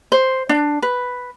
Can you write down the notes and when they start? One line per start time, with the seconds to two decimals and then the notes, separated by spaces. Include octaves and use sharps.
0.12 C5
0.49 D4
0.82 B4